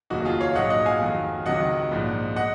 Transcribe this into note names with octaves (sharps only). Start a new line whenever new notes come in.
F1 D#2 C#3 F#3 D#4 F#4
F4 G#4
C#5 F5
A#1 G#2 F#3 D#5 F#5
D#5 F#5
F5 G#5
F2 D#3 F#3
C#2 C3 D#3 F#3 D#5 F#5
A#1 G#2 F3
D#5 F#5